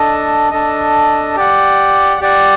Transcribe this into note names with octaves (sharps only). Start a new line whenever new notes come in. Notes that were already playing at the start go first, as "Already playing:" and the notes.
Already playing: D4 A4 D#5
D4 A4 D#5
G4 D5 F#5
G4 D5 F#5